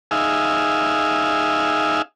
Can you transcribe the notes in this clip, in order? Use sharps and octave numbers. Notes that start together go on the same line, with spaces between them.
D#4 G#4 E5 F5